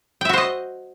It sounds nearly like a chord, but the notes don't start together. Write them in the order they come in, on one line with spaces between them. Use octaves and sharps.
G5 E5 F#4 C5 D#5